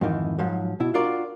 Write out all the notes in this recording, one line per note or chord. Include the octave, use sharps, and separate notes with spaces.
F2 G#2 D#3 E3
G#2 F3 F#3
B2 E4
D4 F4 F#4 A#4 D5